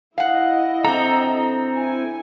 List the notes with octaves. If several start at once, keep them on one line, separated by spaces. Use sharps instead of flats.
E4 D#5 F5 F#5
D3 C4 A4 A#5
E4 G#5